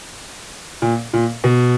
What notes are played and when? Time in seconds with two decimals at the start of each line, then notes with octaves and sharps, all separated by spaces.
0.82 A#2
1.13 A#2
1.44 B2